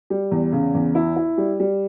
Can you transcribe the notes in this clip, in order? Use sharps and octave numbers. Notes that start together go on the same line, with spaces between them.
G3
E2
C#3
E2
E4
E4
G3
G3